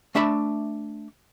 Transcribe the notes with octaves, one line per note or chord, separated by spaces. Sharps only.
A3 D4 E5 A5 B5